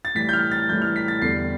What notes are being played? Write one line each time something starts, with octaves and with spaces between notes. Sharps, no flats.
A6
A2 E3 G3 B6
G6
F6
A6
A2 E3 G3 G6
F6
B6
A6
E2 D3 G3 C7